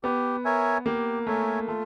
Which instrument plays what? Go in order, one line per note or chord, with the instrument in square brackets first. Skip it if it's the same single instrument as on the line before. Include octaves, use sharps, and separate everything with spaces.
[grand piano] B3 [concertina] G4
[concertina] A#4 C#5 E5 G#5
[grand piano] A#3 [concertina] G4
[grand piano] A3 [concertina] A#4 C#5 E5 G#5
[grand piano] A3 [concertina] F4